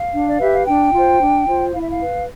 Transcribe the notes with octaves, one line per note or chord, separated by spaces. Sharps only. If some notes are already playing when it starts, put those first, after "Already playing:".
Already playing: F5
D4
D5
G4 B4 E5
F5
D4 G5
F4 C5
D4
F4 C5
E4 F5
E5
F5
B4